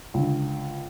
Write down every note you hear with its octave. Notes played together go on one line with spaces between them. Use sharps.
C#2 D3